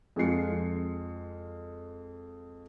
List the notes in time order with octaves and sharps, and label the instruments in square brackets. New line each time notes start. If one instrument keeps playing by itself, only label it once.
[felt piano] F2 G#3 F4 C7 C#7